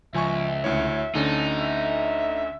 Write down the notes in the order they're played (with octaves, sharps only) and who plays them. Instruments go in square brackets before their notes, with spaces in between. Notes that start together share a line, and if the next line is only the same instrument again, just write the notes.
[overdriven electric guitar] C#2 [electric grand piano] F3 G#5 C#6 [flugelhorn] E5
[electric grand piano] D2 E4 C#5
[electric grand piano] D2 D3 C#4 [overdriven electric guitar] D#4 [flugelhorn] A4
[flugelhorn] E5